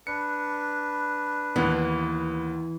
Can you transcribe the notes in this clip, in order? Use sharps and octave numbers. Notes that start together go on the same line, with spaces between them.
D4 B4 C#7
D#2 E3 B3